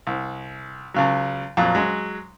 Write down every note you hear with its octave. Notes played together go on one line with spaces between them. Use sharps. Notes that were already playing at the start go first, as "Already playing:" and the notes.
C2
C#2 C#3 F#3
F2 A#2 F#3
F#3 G#3